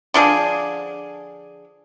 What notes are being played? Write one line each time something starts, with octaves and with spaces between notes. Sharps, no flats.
D3 F3 D4 G#4